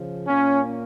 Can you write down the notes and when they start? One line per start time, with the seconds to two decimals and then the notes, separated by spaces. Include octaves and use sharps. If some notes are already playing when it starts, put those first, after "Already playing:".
Already playing: C#3 F3
0.28 A#2 A#3 C#4